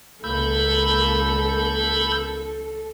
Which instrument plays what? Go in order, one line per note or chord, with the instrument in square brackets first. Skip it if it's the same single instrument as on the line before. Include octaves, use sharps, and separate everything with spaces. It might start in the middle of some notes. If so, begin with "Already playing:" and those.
[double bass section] C#2 A#3 [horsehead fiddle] A4 [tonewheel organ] B5 E6 G6